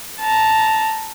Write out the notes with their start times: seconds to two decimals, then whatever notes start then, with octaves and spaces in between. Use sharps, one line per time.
0.20 A5 A#5